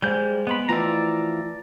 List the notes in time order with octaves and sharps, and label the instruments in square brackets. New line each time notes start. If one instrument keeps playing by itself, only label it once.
[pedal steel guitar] G3 G6 [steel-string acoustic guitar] G#3 [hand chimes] G#4 C5 F5
[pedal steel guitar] B3 B5 [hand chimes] D#5 C6 D7
[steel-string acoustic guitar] E3 F3 F4 [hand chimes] A3 G5 E6 [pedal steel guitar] D5 A#5